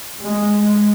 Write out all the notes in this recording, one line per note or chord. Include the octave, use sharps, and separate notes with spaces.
G#3